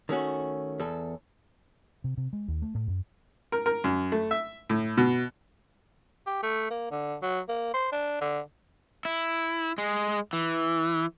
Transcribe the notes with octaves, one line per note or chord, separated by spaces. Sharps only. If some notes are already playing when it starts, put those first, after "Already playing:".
D#3 A3 C#4 F#4
E2 A4
C3
C3
G#3
D#2
A3
A2
F#2
A#4
A#4
F#2
A3
E5
A2
B2
G4
A3
A#3
D3
F#3
A#3
C5
D4
D3
E4
G#3
E3